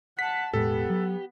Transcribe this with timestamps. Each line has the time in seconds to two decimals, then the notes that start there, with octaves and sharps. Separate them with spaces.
0.19 F#5 A5 B6
0.54 E1 A2 G#3 B3 G4 A4
0.90 F#3